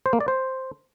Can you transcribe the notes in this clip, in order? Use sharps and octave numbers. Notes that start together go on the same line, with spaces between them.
C5
A#3
D5
C5